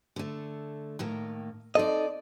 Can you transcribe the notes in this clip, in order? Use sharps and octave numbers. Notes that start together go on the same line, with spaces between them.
D3 A3
A2 D#3 A#3
C4 D#4 A4 D5 D#5